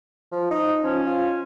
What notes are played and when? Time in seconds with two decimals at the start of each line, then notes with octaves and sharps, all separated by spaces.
0.32 F3
0.51 D#4
0.83 F3 C#4
1.07 F4